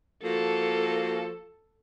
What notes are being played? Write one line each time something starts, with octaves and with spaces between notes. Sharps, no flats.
F3 A#3 F#4 A4